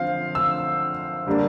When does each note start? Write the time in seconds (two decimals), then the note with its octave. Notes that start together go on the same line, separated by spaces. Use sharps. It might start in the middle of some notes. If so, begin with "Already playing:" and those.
Already playing: D3 F3 C4 F5
0.35 E6
1.26 D3 G3 A#3 D4